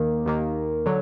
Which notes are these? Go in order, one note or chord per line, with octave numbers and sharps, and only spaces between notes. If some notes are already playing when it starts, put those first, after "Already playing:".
Already playing: D#2 D#3 A#3
D#2 D#3 A#3
D3 F#3